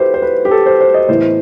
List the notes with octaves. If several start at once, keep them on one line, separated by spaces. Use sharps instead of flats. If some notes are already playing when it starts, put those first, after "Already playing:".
Already playing: E4 F#4 G4 A4 B4 C5
C5
B4
G4
A4
C5
C5
D#5
A2 E3 B3 C5